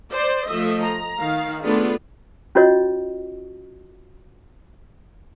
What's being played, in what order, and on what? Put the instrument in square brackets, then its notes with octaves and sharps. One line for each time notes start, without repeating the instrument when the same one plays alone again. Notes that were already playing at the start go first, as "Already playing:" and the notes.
[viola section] C5 D5
F3 A3 D#5 E5
A#5
D#3 F5
A3 B3 D4 F4 G#4
[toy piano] C#4 F4 F#4 C#5 D#5